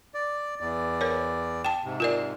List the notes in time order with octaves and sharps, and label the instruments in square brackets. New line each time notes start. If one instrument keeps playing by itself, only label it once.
[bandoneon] D5
E2 D5
[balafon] A#4 C#5
G5 A5
[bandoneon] G#2 C3
[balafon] F4 A#4 D5